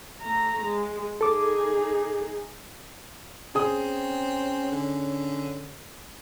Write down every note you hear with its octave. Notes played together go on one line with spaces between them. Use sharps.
A3 A#5
G#3
D#4 G#4 A4 D6
C4 C#4 G#4 D#6
D3